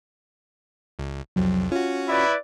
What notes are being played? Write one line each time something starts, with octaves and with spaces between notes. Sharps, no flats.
C#2
C2 F2 F#3
C#4 F4 F#4
E4 B4 D5